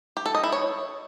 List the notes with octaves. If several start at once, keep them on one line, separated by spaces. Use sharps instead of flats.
G4
A4
D#5
E4
C#5